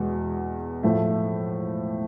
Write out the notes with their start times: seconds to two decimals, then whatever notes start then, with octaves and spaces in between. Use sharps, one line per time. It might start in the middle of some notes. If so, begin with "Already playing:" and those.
Already playing: E2 B2 G#3
0.83 A2 F3 A3